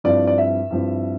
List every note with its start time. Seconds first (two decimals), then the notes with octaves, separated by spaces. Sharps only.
0.04 G2 F3 C4 E4 D5
0.27 D5
0.38 E5
0.70 G2 F3 C4 E4